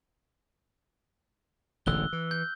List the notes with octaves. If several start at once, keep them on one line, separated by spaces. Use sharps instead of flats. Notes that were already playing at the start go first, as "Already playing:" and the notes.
E1 A1 D3 E6 F#6 G7
E3
G6